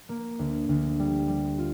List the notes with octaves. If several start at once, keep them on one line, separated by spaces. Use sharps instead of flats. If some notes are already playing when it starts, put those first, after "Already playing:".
A#3
D2
D2
G3
G3
F4